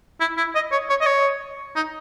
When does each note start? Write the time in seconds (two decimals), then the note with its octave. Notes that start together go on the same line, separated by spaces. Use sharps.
0.20 E4
0.37 E4
0.55 D#5
0.72 C#5
0.89 C#5
1.01 D#5
1.06 C#5
1.76 D#4